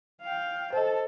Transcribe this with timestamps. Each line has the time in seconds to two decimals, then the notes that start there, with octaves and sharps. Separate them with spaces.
0.21 F5 G5
0.73 A4 C5 D#5